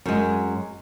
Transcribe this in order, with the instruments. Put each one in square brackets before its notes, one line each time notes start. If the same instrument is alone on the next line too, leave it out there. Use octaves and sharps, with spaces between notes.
[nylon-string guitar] F#2 G#3